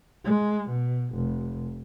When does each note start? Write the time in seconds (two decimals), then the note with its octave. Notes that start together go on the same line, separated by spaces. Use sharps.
0.25 G#3
0.70 B2
1.15 F1